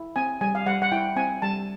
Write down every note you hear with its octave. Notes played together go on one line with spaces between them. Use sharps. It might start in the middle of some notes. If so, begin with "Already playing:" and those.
Already playing: E4
C4 G#5
G3 G#5
F5
G3 F#5
F#5
E4 G5
C4 G#5
G3 A5